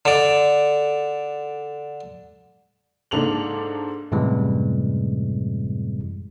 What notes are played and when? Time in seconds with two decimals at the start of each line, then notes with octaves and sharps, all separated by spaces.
0.05 D3 D5
3.11 G#2 A#3 D4 A4 F7 F#7
4.12 F#2 A2 C3 E3 G3 G#3